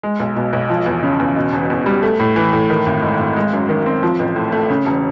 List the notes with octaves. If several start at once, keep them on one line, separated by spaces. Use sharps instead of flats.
G#3
B1
B2
B1
F3
E2
C#3
E2
B2
E1
E2
G3
A3
A2
E3
A2
D#3
G#1
G#2
G#1
G#3
F#2
D#3
C4
F3
A1
A2
A3
C#3
E1